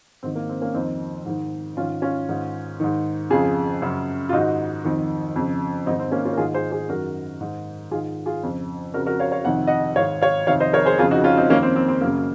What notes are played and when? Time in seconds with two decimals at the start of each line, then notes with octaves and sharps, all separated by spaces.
0.23 G#2 D#3 C4
0.35 A#3
0.49 C4
0.61 A#3 C#4
0.74 F2 D#3 C4 D#4
1.25 G#2 D#3
1.76 G#2 C#4 F4
1.81 D#3
2.02 C#4 F4
2.29 G#2 D#3
2.80 G#2 D#3
3.30 F2 C#3 F4 G#4
3.82 F#2 C#3
4.29 F4
4.32 G#2 D#3 D#4 F#4
4.84 F2 D#3
5.36 F2 C#3
5.86 G#2 D#3 C4 D#4
5.99 C4
6.12 A#3 C#4
6.25 C#4 F4
6.33 A#4
6.37 G#2 D#3 F4 G#4
6.54 G#4 C5
6.72 G#4 C5
6.89 F#2 D#3 F#4 A#4
7.40 G#2 D#3
7.91 G#2 D#3 F4 G#4
8.26 F4 G#4
8.43 F2 C#3
8.93 F2 C#3 F#4 A#4
9.06 F#4 A#4
9.19 C#5 F5
9.32 C#5 F5
9.45 F2 C3 D#3 F#5
9.67 D#5 F#5
9.96 G#2 D#3 C#5 F5
10.21 C#5 F5
10.47 F2 C3 D#3 C#5 F5
10.60 C5 D#5
10.73 A#4 C#5
10.85 G#4 C5
10.98 F2 F4 G#4
11.03 C#3
11.11 D#4 F#4
11.24 C#4 F4
11.37 C4 D#4
11.50 D#3 A#3 C#4
11.54 F2
11.62 C4
11.76 C4
11.88 C4
12.01 F#2 C#3 A#3